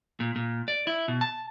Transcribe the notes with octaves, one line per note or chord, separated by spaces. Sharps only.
A#2
A#2
D5
E4
B2
A5